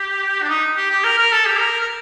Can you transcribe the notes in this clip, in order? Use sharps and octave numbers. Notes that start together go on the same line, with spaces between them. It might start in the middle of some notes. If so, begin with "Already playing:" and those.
Already playing: G4
D4
D#4
G4
G4
A#4
A#4
A4
G4
A#4
A#4